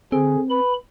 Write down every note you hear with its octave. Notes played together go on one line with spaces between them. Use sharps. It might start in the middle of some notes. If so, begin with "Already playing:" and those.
D3 C4 G#4
B4 B5